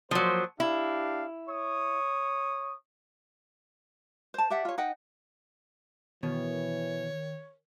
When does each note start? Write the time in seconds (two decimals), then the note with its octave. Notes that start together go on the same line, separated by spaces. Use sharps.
0.11 F3 F#3 A#3 C5
0.60 D4 E4 G4 F5
1.49 C#5 C#6 D#6
4.34 C5 A5
4.50 G4 D5 E5 F#5
4.65 F4 C#5
4.78 D#4 D#5 F#5 G5
6.23 B2 D#3 E3 C#5